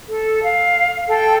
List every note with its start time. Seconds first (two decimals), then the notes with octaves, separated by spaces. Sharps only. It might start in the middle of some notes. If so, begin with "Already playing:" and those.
0.09 A4
0.43 F5
1.06 A4 G5